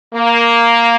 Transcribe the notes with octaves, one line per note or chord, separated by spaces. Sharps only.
A#3